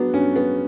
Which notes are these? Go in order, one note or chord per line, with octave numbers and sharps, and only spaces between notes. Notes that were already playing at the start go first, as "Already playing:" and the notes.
Already playing: F#3 B3 D4
G2 C#4
B3